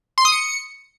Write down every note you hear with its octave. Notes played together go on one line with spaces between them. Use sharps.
C6
D#6
C#7